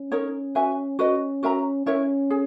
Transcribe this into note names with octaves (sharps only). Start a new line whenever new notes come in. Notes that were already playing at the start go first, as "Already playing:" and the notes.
Already playing: C#4
D#4 A#4 C#5
F#4 B4 E5 G#5
C#4 F#4 B4 D#5
F#4 A#4 E5 A#5
C#4 E4 A#4 C#5 E5
G#4